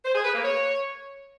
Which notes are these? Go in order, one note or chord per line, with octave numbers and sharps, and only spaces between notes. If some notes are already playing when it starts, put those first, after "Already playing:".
C5
G#4
B4
A#3
C#5